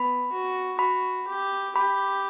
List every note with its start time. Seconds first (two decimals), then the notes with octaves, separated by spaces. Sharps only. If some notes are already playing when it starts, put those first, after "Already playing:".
Already playing: B3 B5
0.32 F#4
0.79 F#4 B5
1.28 G4
1.76 G4 B5